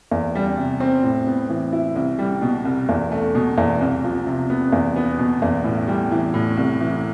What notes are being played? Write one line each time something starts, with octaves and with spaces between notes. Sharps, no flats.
E2
G3
C3
C4
A2
B3
E3
E4
C2
G3
B2
C2
E2
A3
B2
E2
C2
F3
C3
B3
E2
B3
B2
E2
A2
G3
E3
A2
C2
E3